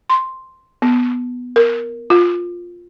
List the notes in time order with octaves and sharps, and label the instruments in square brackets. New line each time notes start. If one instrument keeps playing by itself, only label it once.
[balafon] C6
B3
A#4
F4